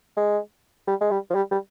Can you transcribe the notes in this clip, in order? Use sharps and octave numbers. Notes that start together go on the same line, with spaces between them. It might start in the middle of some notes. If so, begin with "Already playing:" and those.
G#3
G3
G#3
G3
F3
G3
G3